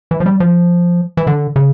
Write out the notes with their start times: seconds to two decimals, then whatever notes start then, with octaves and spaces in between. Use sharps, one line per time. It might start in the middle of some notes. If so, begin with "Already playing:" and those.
0.11 E3
0.20 F3
0.26 G3
0.40 F3
1.17 E3
1.27 D3
1.56 C#3